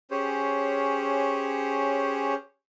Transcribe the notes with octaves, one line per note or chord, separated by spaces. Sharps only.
C#4 G4 G#4 C5 C#5